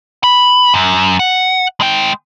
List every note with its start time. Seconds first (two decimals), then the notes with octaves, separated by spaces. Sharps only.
0.24 B5
0.74 F#2
1.19 F#5
1.81 G#3 G5